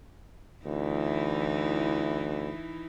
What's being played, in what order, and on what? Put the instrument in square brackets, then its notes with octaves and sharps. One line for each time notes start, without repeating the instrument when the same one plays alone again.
[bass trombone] D2 [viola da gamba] E3 D#4 E4